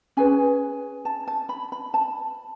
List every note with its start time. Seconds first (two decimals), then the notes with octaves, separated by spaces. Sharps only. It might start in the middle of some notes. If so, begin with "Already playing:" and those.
0.17 C#4 G#4 B4 G#5
1.05 A5
1.28 A5
1.49 B5
1.72 B5
1.94 A5